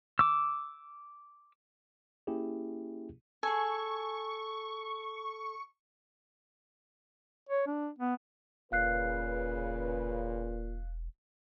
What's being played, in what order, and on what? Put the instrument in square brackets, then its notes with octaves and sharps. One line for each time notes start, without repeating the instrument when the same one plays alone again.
[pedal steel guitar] D6 E6
[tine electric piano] A#3 C#4 E4 G4 G#4
[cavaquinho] G#4 G#5 [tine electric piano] A4 [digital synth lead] C#6
[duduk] C#5
D4
B3
[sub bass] E1 [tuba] A#2 [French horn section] C#3 B4 [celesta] F5 F#6 C7